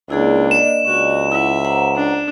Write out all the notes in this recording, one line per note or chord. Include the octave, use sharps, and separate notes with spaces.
C#2 A#3 D4 E4 G#4 D5
D5 D#5 E7
C#2 F#4
E4 E5 F#5
C5 F#5 A#5
D4